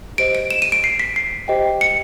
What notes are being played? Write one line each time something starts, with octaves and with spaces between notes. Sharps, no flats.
G4 C5 D#5 D7
D7
E7
D#7
D7
C7
B6
C7
G4 C5 D#5 G5
C#7